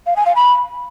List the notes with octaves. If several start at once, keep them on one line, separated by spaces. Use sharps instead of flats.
F5
G#5
F5
B5